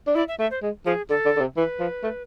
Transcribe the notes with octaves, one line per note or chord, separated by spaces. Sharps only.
D4
E4 D5
E5
A3 E5
C5
G#3
F3 G#4
D3 A4
D3
D3
C3
E3 B4
F3
A3